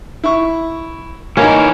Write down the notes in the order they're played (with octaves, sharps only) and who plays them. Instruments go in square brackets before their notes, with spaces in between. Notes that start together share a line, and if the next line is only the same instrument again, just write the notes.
[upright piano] E4 C#6
[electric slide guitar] E3 A#4 [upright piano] A#3 D#4 [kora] C#4